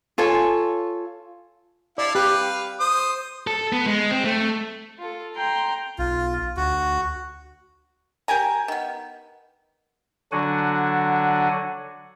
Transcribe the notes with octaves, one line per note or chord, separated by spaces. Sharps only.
F4 A4 C#5 G#5
E4 D5 F5
G4 B4 F5
C5 D#6
A4
B3
G#3
C4
A3
F4 A4
G5 A#5 C6
B1 F4
D2 F#4
G4 A#4 G#5 A#5
D#3 B3
D3 F#3 D4 F#4 F#5 G#5